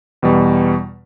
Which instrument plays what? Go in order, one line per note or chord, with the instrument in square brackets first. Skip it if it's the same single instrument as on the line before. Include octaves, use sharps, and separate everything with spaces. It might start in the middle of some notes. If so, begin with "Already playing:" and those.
[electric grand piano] E2 B2 G3